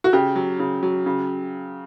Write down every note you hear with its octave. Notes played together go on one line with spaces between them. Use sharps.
F#4
C#3 G4
F#3
C#3
F#3
C#3